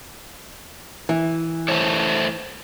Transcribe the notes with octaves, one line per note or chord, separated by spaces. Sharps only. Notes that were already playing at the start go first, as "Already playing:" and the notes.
E3
A3 C5 C#5